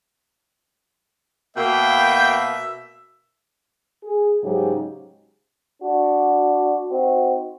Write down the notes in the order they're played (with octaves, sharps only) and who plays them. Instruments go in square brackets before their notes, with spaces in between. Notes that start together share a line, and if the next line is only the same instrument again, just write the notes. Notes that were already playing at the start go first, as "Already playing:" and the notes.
[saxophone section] B2 A#3 [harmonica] E5 [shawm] G5
[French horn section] G#4
G#2 C#3 F#3 G4 G#4
[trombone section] D4 F#4
C4 D#4 F#4